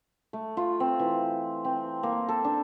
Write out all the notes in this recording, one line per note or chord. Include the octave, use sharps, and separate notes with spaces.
A3
F4
C4
E3
C4
A#3
A4
D4